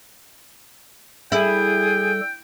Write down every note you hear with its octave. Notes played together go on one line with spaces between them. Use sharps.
G3 E4 G#4 A4 G5